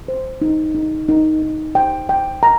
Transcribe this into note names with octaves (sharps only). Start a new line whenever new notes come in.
C5
D#4
D#4
D#4
D#4
G5
G5
A#5